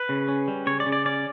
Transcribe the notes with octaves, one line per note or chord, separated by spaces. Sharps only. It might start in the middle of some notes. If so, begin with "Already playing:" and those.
Already playing: B4
C#3
C#4
G3
C#3 C#5
D5
C#3
D5
C#4 D5